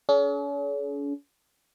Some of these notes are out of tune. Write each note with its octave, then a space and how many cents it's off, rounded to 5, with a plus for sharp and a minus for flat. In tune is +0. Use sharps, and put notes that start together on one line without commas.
C#4 +40 G#4 +45